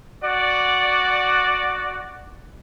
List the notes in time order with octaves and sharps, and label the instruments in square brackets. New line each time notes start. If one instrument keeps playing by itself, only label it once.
[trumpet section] F#4 D5